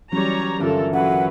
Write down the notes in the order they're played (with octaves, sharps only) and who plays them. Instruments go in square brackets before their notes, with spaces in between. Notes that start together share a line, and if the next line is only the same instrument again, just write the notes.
[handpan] E3 F#3 C#4 [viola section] G3 C#5 A#5
[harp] G1 E3 [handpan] C#4 F4 [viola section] A4 A#4
[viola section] F#3 B4 [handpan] C#4 A#4 [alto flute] F#5